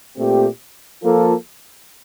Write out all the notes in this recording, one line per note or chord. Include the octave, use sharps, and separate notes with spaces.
A#2 A3 C4 G4
F3 A#3 F4 A4